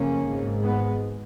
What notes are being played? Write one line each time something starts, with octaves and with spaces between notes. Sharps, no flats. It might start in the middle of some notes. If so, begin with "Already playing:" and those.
Already playing: F#1 F2 C#3 A#3 C#4
G#1 G#2
G#3 B3